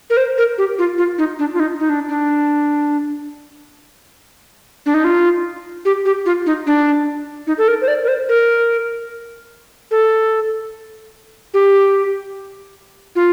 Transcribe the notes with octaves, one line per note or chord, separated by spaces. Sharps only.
A#4
C5
A#4
G4
F4
F4
D#4
D4
F4
D#4
D#4
D4
D4
D4
D#4
F4
G4
G4
F4
D#4
D4
D#4
A4
A#4
C5
D5
A#4
C5
A#4
A4
G4
F4